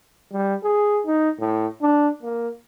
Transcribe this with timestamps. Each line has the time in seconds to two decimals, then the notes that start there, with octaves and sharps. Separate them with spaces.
0.33 G3
0.64 G#4
1.06 D#4
1.39 A2
1.82 D4
2.23 A#3